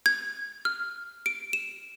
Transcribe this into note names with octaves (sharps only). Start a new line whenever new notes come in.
G#6
F6
D7
E7